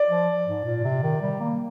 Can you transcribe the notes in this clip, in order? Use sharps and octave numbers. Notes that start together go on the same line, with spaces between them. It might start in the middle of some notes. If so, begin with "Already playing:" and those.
Already playing: D5
F3
G#2
A#2
C3
D#3
G3
A#3